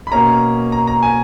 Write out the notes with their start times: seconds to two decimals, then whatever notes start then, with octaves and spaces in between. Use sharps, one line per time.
0.07 B5
0.12 B2 A#3 C#4 A#5
0.72 A#5
0.87 A#5
1.03 G#5